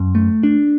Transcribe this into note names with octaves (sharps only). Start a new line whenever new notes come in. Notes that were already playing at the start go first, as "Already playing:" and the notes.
Already playing: F#2
A3
D4